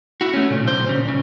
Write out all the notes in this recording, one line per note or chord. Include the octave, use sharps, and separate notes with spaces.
E4 F#4
A3 C#4
A#2 C#3
B1 C5
A#2 C#3
D2 C#3